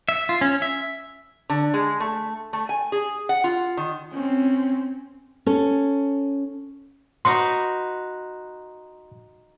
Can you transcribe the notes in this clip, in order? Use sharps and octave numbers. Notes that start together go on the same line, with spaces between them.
E5
F4
C#4
E5
D3
G#3
A3
A3
G#5
G#4
F#5
F4
D#3
C4 C#4
C#4 A4
D#4 F#4 B4 C6